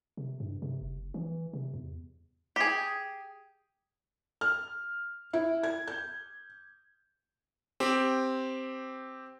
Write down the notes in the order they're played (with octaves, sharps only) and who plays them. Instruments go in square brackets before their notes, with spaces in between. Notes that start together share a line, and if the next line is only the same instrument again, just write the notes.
[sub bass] C3
G2
C3
F#1
E3
C3
E2
[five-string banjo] G4 G#4
[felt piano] F6
E4
G#6
G6
[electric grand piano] C4 G4